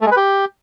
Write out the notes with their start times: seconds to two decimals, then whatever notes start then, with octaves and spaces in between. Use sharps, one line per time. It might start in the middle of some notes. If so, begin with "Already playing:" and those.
0.01 A3
0.06 G#3
0.11 B4
0.17 G4